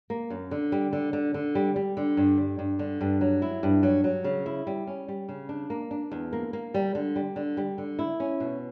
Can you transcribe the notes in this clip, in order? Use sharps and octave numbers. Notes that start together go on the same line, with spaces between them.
A#3
F#2
D3
G3
D3
D3
D3
G3
G3
D3
G2
G3
G2
D3
G2
F#3
E4
G2
F#3
F#3
C#3
E4
G3
C#4
G3
C#3
D4
A#3
D4
E2
A#3
A#3
G3
D3
G3
D3
G3
D3
E4
C#4
B2